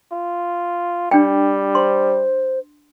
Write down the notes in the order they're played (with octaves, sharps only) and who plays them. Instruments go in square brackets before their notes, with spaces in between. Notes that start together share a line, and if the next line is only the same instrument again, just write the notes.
[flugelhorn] F4
[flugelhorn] G3 [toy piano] D4 G5
[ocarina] C5 [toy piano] C6